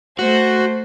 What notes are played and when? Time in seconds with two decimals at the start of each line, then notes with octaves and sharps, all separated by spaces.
0.19 A3 F#4 C5